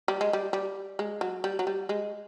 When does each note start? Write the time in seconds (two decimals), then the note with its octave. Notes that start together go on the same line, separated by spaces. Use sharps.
0.08 G3
0.21 G#3
0.33 G3
0.53 G3
0.99 G#3
1.21 F#3
1.44 G3
1.59 F#3
1.67 G3
1.89 G#3